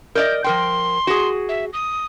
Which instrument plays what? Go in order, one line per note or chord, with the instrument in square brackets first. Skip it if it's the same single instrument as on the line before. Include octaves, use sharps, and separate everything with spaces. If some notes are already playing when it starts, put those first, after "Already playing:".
[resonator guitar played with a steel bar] A#4 D5 D#5 [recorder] G6
[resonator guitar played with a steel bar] F3 A#4 G5 [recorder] C6
[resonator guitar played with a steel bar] F#4 G#4
[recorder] E5
D#6